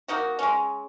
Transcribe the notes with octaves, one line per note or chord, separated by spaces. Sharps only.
A#3 D#4 F#4
G#3 C#4